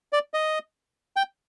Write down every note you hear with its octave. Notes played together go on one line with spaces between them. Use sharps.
D5
D#5
G5